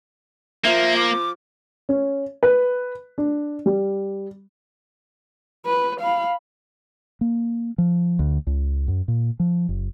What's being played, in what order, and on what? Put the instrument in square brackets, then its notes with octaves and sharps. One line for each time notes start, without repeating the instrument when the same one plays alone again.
[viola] F3 [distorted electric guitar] A#3 [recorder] E5
[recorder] D6
[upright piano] C#4
B4
D4
G3
[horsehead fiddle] B4
F5 B5
[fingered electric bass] A#3
F3
D2
C#2
F#2
A#2
F3
F#1